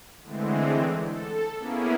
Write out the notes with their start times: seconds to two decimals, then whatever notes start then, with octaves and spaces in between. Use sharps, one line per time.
0.23 D3 E3 G#3 A3 C4
1.03 A4
1.57 A#3 B3 C#4 E4 G#4